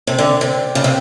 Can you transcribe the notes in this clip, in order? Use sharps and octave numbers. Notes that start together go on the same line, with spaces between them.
C3
D3
C3
C#3
C3